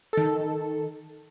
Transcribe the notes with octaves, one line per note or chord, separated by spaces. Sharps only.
D#3 A4